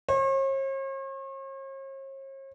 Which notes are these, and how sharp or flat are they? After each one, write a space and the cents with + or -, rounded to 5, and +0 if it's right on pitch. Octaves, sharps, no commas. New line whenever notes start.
C#5 -45